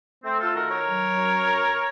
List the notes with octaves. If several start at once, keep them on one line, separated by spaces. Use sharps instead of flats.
A3 C4
F4 A4
D#3 F#4 A#4
A#4 C#5
F#3
F#2